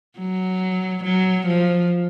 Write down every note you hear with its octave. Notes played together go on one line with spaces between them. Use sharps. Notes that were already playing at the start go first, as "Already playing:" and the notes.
F#3
F#3
F3